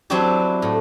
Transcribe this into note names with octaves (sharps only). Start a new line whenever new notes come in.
F#3 C4 D4 E4 F#4 G4
A2